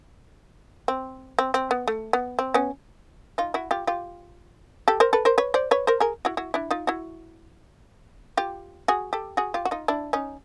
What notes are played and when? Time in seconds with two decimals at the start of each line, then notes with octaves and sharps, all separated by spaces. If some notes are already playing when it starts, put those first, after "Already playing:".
0.88 C4
1.39 C4
1.54 C4
1.71 B3
1.88 A3
2.13 B3
2.39 C4
2.54 B3 C#4
3.38 D#4 F4
3.54 E4 F#4
3.71 F4 G4
3.87 F4 G4
4.88 G4 A4
5.00 A#4 C5
5.13 A4 B4
5.25 A#4 C5
5.38 B4 C#5
5.54 C5 D5
5.71 B4 C#5
5.87 A#4 C5
6.00 G#4 A#4
6.25 E4 F#4
6.37 E4 F#4
6.54 D4 E4
6.71 D#4 F4
6.87 E4 F#4
8.37 F4 G4
8.88 F#4 G#4
9.13 G4 A4
9.37 F#4 G#4
9.54 F4 G4
9.65 F#4
9.71 D#4 F4
9.88 D4 E4
10.13 C#4 D#4